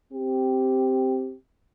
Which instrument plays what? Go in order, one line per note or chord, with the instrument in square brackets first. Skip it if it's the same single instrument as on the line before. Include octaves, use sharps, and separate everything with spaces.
[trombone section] C4 G4